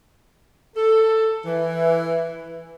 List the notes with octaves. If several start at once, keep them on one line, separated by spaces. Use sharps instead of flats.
A4
E3